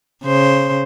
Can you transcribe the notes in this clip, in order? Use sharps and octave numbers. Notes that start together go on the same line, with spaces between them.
C#3 C5